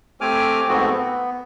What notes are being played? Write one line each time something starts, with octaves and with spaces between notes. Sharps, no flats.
A3 C4 G4 G#5 D6 F6
G#2 F3 A3 B3 C4 F#4
B3